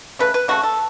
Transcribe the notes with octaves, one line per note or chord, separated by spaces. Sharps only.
C#3 A3 B4
B4
C#3 A3 F#4
A4